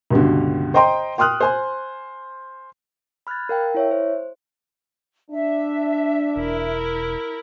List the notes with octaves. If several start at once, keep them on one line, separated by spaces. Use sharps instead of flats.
C#2 G2 B2 D3
C5 D#5 G5 A#5 C6
G5 C6 D#6 F6 F#6
C5 G#5 C6
B5 F6 F#6 G#6 A6
A#4 F5 G5
E4 C#5 E5
C5
D4 E5
E1 E4 A#4